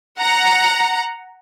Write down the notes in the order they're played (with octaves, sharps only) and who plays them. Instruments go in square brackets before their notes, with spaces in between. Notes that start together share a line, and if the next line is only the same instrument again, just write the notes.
[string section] F#5 A#5